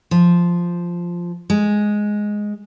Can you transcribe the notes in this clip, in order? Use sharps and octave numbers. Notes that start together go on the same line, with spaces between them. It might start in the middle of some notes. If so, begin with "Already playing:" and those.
F3
G#3